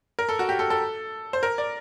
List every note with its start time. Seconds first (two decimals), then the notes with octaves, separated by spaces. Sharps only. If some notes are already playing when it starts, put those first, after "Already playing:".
0.19 A#4
0.29 A4
0.39 F#4
0.49 G4
0.59 A4
0.70 A4
1.33 C5
1.43 A#4
1.58 D5